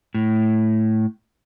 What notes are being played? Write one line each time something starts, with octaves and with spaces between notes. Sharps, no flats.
A2